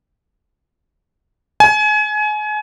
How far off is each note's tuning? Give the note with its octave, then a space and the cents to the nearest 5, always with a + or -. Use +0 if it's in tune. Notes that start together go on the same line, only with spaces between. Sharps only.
G#5 +30